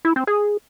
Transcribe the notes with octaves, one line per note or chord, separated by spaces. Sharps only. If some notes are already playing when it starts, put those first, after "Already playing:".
E4
C4
G#4